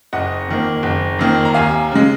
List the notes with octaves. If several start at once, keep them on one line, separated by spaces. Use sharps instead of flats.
F#1 D#5 F#5
F2 D#3 A#3
F#1
F2 D#3 A#3
A#5
D#2 F5 G#5
C#3 G#3